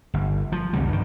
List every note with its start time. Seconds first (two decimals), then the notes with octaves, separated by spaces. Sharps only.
0.14 G1
0.52 F3
0.73 C2 F2 D3 G3
0.89 G2 D#3